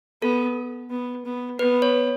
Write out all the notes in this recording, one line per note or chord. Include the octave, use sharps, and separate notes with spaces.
B3 A4
B3
B3
B3 B4
C#5